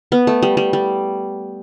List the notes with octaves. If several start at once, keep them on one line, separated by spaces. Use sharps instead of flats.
B3
A3
G3
G3
G3